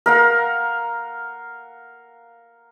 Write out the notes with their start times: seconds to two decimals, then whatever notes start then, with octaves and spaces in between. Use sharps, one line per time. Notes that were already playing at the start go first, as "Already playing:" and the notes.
0.06 A#4 F5 F#5